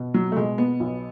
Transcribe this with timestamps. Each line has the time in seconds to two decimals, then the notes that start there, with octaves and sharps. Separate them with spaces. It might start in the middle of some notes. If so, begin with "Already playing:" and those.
Already playing: B2
0.14 F#3
0.32 A3
0.36 B2 G#3
0.58 B3
0.80 B1